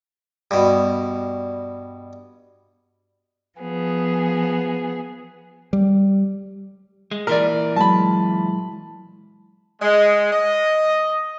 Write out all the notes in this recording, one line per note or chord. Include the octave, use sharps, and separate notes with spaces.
G2 B2
F3 B3 G#4
G3
G#3
A#2 E3 A#4 D5
F#3 G#3 A5 B5
G#3
D#5